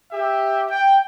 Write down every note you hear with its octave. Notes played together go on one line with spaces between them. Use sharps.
G4 E5
G5